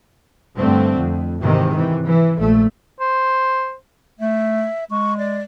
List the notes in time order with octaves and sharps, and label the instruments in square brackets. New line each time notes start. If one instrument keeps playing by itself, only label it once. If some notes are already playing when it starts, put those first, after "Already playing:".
[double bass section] G2 D3 A3 C4
F2
G#2 C3 D#3 E3
C3 E3
E3
A#1 A3
[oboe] C5
[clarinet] A3 [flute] E5
[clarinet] G#3 [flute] C#6
[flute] D5